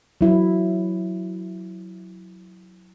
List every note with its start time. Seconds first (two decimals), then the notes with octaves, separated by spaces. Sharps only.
0.21 F#3 E4